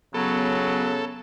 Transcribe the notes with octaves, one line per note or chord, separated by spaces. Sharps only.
C#3 F#3 B3 A4